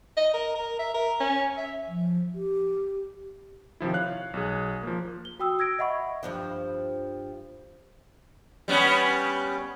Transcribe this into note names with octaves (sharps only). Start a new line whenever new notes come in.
D#5
A#4
A#4
E5
A#4
C#4
E5
F3
G4
C3 D#3 F3 E4
C#5 F5 F#6
B1 G#4
F3 A#3
G7
F#4 G5 D#6 E6
E6 G#6 A#6 D7
D#5 E5 F#5 B5 C#6
G2 F3 D4
G3 B3 C#4